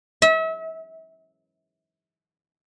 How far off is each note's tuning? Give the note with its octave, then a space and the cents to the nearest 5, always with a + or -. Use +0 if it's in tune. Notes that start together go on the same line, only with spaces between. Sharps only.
E5 -35